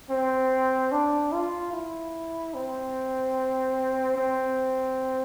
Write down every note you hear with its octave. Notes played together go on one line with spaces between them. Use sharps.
C4
D4
F4
E4
C4
C4